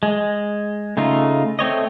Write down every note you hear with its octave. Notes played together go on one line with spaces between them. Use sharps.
G#3
C#3 A3 D#4 F4
A3 C4 C#5 D#5